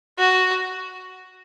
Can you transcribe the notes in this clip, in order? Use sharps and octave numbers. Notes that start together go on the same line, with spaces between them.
F#4